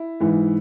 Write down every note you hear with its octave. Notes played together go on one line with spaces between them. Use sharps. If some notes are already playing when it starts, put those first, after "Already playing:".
Already playing: E4
G#2 E3